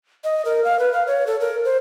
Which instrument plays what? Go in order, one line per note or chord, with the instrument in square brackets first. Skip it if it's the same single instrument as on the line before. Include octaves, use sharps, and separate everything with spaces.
[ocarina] D#5
A#4
F5
B4
F5
C#5
A4
A#4
C5